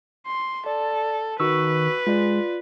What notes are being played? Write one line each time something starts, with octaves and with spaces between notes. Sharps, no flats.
C6
A4 D5
D#3 F#4 B4 C#6 E6
G#3 F4 D5